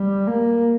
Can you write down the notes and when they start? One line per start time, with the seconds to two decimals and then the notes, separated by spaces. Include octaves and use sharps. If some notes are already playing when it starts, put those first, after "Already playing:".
Already playing: G3
0.27 A#3